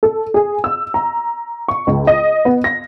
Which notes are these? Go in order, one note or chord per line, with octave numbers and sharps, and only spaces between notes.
A4
G#4
E6
A#5
C#6
C#2
D#5
B3
A#6